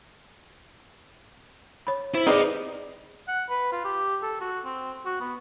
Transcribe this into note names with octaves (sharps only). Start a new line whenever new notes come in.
C#5 B5
E4 C5
C4 D#4 G4 G#4 B4 D5 D#5
F#5
B4
F4
G4
A4
F#4
C4
F#4
B3